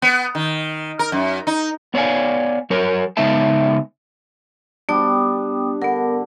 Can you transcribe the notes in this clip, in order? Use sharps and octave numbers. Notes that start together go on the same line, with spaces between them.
B3
D#3
A#4
F#2
D#4
B3 C#5 D5 F5 G#5
F#3 F#4 A#4 C#5
C#3 G#3 B3 D#4 E5 A5
G3 B3 D4 G5 D#6
D3 B3 A#4